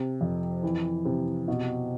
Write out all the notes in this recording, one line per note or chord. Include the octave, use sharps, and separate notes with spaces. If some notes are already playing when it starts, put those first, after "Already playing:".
Already playing: C3
F2
E3
C3
B2